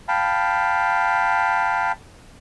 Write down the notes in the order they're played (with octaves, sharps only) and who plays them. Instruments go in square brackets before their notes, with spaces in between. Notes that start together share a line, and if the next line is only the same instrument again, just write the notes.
[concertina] F5 G5 A5 B5